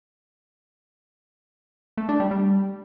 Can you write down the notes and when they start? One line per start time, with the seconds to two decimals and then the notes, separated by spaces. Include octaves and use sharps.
1.97 A3
2.09 D4
2.20 G3
2.31 G3